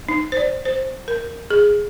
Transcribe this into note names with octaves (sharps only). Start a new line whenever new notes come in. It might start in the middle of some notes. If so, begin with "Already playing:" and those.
D#4
C5
D5
C5
A#4
G#4